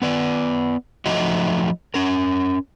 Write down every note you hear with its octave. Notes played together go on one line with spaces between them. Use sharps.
B3 B4 D5
F3 F#3 A3 D#4 F#4 D#5
C#4 A#4